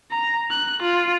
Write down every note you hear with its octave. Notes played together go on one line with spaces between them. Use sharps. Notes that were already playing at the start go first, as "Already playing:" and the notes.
A#5
F#6
F4